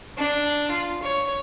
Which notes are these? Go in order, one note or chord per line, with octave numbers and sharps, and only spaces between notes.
D4
F4
C#5